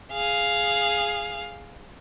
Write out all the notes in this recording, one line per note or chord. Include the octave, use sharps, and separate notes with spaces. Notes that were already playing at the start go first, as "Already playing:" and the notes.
G#4 F5